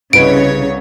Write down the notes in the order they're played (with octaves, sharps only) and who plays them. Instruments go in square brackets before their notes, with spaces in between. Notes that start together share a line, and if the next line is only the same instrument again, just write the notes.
[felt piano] C2 B4 D#5 [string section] C#3 C#5 [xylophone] D7